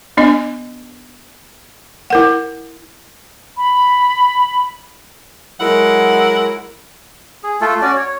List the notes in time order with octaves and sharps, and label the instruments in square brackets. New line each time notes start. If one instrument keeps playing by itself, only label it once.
[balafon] B3 D4 D#5
E4 A#4 F#5
[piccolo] B5
[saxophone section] F#3 G#3 E4 A#4 F#5
[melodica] G#4
A3 F4 A4
C#4 F#4 D5
C#5